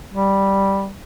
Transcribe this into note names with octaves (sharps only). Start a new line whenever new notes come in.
G3